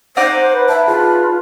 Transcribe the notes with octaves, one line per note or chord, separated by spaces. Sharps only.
D#4 C5 D5 F#5
B4
E5 A5
F4 G#4 A5